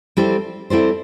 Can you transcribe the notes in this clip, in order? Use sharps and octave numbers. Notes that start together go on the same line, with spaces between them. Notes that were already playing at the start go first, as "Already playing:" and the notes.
G3 C4 E4 A4 C5
G3 C4 E4 A4 C5